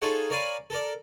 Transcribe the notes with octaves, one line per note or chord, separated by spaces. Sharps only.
D#4 F4 G#4 A4 C#5 F#5
A#4 C#5 D5 F5 G#5 B5
A4 A#4 D5